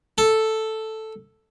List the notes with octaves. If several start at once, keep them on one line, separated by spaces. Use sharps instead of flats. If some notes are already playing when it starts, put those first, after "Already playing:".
A4